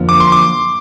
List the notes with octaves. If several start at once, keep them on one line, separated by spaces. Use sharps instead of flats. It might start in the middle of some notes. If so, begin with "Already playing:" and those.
Already playing: F2 D3 F3 A#3 F4
D6
C6
D6